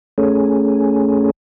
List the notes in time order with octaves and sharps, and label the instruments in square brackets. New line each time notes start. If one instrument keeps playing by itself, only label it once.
[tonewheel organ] A3 C#4 G#4